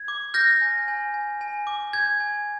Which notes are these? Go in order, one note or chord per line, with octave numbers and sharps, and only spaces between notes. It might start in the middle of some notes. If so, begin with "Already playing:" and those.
Already playing: G#6
D6
F6 G6 A#6
G#5
G#5
G#5
G#5
D6
G6 G#6
G#5